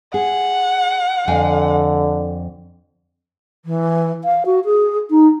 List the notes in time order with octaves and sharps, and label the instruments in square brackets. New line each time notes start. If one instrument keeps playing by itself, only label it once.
[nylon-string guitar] G#4 [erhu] F#5
[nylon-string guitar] F2 F5 G#5 [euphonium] D3
[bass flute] E3
F5
F#4
G#4
D#4